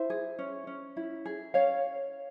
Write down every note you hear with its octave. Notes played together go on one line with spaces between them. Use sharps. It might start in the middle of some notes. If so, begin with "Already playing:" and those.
Already playing: E4 C5 E5
G#4
C#4
C#4
E4
G#4
C#4 C#5 F5